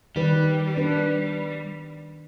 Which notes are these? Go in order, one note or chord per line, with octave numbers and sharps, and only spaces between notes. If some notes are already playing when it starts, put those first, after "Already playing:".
D#3 G3 B4
D4 B4